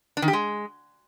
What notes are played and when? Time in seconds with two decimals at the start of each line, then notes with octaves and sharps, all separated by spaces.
0.17 D4
0.22 D#3
0.28 G4
0.33 G#3